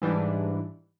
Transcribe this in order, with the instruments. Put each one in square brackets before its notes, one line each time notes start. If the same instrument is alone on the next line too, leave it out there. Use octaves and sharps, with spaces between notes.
[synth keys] G#2 E3 G3 D4